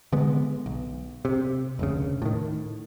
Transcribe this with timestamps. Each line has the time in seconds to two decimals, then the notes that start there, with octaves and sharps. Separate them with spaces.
0.12 D3 G#3 B3
0.66 B1
1.25 C3
1.79 F1 D2 C#3
2.22 A2 D#3